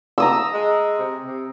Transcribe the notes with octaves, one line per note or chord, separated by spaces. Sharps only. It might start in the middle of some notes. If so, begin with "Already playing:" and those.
A#5 D#6 E6
G#3
C3
C3